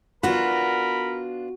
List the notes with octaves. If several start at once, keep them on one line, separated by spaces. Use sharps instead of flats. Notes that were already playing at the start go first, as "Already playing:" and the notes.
B3 D4 F4 F#4 A#4 B5